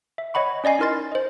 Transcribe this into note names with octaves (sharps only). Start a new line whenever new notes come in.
E5
C#5 D#5 F#5 B5 C#6
C#4 D5 D#5 G#5 C7
D#4 E4 A#4 C6 A6
C5 D#5